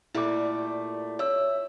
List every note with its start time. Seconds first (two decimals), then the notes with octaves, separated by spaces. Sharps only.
0.15 A#2 G3 A3 E4 D6
1.19 C#5 E5 E6